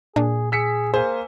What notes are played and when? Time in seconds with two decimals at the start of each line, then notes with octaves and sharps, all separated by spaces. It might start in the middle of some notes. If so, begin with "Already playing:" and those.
0.16 A#2 D4 G#4
0.52 G#4 E6 B6 C#7
0.94 A#3 G#4 C5 G#5